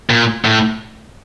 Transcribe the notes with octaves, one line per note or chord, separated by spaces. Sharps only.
A#2
A2